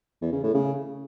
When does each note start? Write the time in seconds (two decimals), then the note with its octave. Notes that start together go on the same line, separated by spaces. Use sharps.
0.21 E2
0.32 C#3
0.43 A2
0.54 C#3